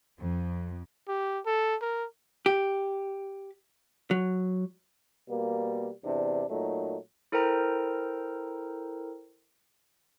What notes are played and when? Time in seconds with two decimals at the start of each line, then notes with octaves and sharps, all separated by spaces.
0.20 F2
1.08 G4
1.46 A4
1.82 A#4
2.46 G4
4.11 F#3
5.28 B2 G3 A#3
6.04 E2 C3 D4
6.50 A#2 F#3 A3 D#4
7.32 E4 A4 A#4 C5 G5 A#5